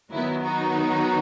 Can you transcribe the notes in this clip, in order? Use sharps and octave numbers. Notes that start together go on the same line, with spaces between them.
D#3 F#3 B3 E4
D#4 F#4